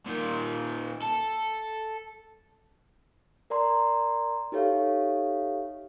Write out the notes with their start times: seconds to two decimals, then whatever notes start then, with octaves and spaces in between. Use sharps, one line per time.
0.06 A#2 D#3
1.02 A4
3.50 A#4 D5 A#5 C6
4.52 D#4 G4 A4 C#5 E5 F5